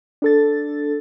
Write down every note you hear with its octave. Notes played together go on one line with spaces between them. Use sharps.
D4 A4 A6